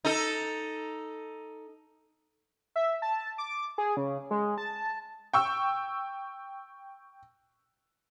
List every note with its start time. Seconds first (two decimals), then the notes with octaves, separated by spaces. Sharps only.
0.05 D#4 A4
2.76 E5
3.02 A5
3.38 D6
3.78 G#4
3.97 C#3
4.31 G#3
4.58 A5
5.33 G5 C#6 E6